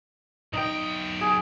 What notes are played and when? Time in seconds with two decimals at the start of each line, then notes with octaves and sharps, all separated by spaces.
0.53 B1 D#4 D#5 G5
1.21 G#4